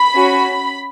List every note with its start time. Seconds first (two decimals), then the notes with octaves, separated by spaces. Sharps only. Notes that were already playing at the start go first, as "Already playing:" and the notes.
Already playing: B5
0.15 C#4 F#4